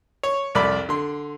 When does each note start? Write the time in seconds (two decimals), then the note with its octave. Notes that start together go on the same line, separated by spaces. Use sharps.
0.23 C#5
0.55 C2 F2 D5 B5
0.89 D3 C6